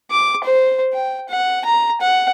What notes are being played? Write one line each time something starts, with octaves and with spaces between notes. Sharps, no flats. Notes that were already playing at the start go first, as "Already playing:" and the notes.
D6
C5
G5
F#5
A#5
F#5